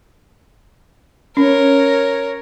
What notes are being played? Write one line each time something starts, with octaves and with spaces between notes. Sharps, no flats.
C#4 A#4 C#5